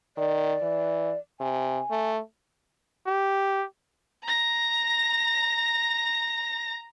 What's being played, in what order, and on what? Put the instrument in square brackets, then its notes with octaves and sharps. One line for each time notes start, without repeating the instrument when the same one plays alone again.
[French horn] D#3 [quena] D5
[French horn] E3
[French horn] C3 [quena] G#5
[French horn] A3
[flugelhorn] G4
[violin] A#5 A#6